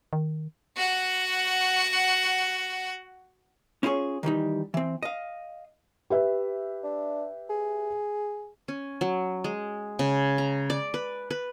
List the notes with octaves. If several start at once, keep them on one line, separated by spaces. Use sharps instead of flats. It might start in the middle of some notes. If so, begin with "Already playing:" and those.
D#3
F#4 F#5
C#4 E4 F4 G#4 C#5
D#3 E3 G3 D#4
E3 C4
D#5 F5
G4 B4 E5
D4
G#4
C#4
F#3
G#3
C#3
A#5
D5
B4
B4